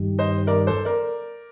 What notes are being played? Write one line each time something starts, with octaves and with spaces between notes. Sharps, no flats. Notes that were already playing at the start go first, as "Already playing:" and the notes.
Already playing: G2 D#3 G3
C5 D#5
A#4 D5
A4 C5
A#4 D5